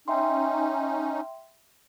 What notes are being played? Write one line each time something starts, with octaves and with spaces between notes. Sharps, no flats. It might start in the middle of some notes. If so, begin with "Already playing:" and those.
C#4 D#4 E5 G5 C6